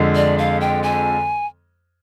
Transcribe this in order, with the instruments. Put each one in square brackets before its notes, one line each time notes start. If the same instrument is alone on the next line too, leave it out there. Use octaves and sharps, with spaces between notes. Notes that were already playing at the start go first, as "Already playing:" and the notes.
Already playing: [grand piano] F2 D3 G#3
[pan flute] D5
F5
G5
G#5